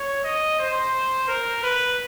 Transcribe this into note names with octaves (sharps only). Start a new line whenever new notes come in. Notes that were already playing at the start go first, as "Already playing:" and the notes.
Already playing: C#5
D#5
C5
A#4
B4